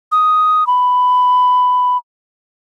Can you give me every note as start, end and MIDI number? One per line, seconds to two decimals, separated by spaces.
0.12 0.66 87
0.67 1.97 83